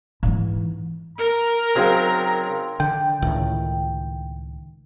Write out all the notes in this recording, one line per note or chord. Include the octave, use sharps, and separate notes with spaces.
G#2 E3
A#4 A#5
C#3 F#3 C4 D#4 G5
D3 G5
C#2 A2 D#3